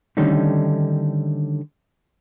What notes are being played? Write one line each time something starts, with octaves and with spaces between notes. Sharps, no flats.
D3 D#3 G3 A3 C#4 D#4